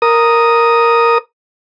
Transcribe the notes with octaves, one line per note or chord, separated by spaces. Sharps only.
A#4 D#6